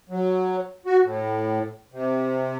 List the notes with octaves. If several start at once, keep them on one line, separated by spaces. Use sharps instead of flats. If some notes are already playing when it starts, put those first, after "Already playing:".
F#3
F#4
A2
C3